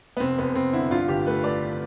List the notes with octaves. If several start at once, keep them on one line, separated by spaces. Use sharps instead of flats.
B3
F1 C4
F1 B3
F1 C4
D3 E4
G2 F4
G1 G4
A3 B4
A3 D5